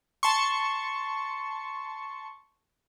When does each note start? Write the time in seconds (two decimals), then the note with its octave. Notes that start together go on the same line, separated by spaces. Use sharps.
0.23 A5 C6 C#6